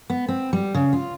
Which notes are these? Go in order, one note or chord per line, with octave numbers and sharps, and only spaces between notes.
B3
C4
G3
C#3
F4